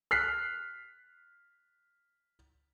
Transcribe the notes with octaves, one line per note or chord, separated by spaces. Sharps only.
F6 F#6 B6 C7